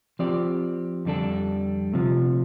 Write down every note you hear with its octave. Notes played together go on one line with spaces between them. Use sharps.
F3 C4 G4 D5
F2 D3 G3 D4 A4
D2 C3 F3